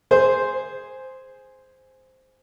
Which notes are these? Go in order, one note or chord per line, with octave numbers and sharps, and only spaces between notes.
G#4 C5